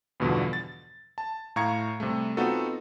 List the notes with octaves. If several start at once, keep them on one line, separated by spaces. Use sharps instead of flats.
E2 G2 B2 D3 E3 F3
A6
A5
A2 F5 A#5 C#6 G#6 C#7
C3 G3 A3
B3 C4 D#4 F4 F#4 A4